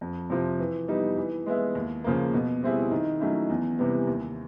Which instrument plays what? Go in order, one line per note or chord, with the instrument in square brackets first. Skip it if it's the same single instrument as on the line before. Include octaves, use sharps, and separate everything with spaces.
[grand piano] F2
C3 F3
E3
G3 B3 D#4
E3
G#3 B3 E4
D#2
C#3 F3 A#3
B2
G3 C4 E4 G#4
D#3
F#3 A3 C#4 E4
E2
C3 E3 G3 B3
D#2